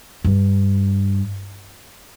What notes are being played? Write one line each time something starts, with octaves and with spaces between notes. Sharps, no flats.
G2